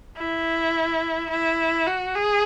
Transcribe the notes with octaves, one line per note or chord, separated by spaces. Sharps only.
E4
E4
F#4
G#4